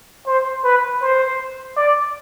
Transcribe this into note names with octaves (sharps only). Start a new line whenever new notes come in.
C5
B4
C5
D5